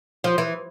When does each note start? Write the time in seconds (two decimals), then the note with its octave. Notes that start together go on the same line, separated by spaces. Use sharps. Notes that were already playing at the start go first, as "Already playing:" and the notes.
0.24 F3
0.38 E3